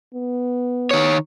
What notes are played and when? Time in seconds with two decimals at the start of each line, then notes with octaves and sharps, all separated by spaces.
0.14 B3
0.91 D#3 C#5